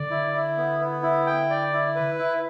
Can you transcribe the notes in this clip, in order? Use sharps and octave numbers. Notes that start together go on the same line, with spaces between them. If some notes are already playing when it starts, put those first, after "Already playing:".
Already playing: D3 D5
E4
E4
B3
B3
E4
G5
D5
E4
B4
E4